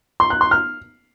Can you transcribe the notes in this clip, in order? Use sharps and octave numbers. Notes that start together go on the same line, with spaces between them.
C6
F#6
C6
F6